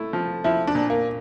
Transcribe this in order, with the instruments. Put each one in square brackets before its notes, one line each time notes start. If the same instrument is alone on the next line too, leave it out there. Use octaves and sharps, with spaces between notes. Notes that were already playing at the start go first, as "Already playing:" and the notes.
Already playing: [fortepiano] A3 E4
F3
[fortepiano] F3 [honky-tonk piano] E4
[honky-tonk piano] D4
[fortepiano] A#2
[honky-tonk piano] A#3